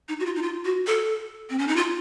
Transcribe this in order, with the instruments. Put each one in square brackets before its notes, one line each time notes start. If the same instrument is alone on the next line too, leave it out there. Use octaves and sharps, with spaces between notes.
[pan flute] D#4
F#4
F4
D#4
F4
F#4
A4
C4
C#4
D#4
F4